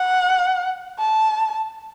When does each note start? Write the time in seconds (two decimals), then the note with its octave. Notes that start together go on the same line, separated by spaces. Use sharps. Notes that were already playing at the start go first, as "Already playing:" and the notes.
Already playing: F#5
1.00 A5